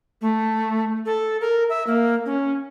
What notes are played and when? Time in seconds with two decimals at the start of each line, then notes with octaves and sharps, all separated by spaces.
0.21 A3
1.06 A4
1.41 A#4
1.69 E5
1.87 A#3
2.26 C#4